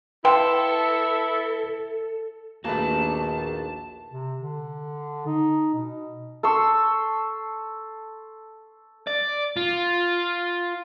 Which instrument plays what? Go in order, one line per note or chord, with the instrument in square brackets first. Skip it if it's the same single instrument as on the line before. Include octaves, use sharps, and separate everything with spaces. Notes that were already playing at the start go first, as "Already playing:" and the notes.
[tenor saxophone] E4 [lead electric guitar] A4 [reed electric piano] B4 [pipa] F5 G5 C6
[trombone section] A#1 D#2 [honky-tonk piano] A3 A#3 [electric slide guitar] F#4 G#4 B4 [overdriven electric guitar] A5
[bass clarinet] C3
D3
D#4
B2
[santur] A4 C6 C#6 E6
[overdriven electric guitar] D5
F4